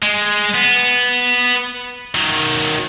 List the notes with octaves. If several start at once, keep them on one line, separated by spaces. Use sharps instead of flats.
G#3
B3
D#3 F#3